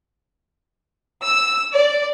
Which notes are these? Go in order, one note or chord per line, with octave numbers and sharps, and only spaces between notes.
E6
D5